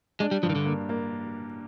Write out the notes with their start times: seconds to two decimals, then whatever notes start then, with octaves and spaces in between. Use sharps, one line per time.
0.20 G#3 D4
0.31 G3
0.43 G2 F3
0.50 D#3
0.55 D3
0.66 A#3
0.89 A#3